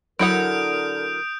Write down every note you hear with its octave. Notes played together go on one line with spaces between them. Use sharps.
D3 F#3 E4 A#4 F#5 D#6 G6 D7